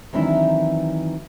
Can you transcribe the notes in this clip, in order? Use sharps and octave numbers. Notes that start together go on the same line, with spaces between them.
D#3 E3 F#3 C4 D4 E4